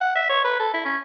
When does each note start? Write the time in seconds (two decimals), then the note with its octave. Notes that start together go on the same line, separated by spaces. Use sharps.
0.01 F#5
0.15 E5
0.29 C#5
0.44 B4
0.59 A4
0.73 E4
0.85 C#4